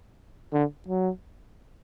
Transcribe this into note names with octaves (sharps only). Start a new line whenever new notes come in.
D3
F#3